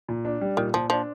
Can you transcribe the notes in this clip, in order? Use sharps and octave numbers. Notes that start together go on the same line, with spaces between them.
A#2
D4
G3
A#2 D#3
A#2 F3
F3 D4